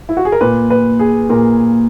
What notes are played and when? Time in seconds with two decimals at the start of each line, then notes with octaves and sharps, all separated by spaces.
0.09 E4
0.17 F#4
0.25 G#4
0.32 A#4
0.41 A#2 B4
0.70 B4
0.99 G#4
1.29 A#2 A#4